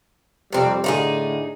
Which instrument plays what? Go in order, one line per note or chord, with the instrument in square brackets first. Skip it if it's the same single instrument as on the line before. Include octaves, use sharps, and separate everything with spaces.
[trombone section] F2 G3 [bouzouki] C3 C4
[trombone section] A2 D3 [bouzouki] D#4 F4 G#4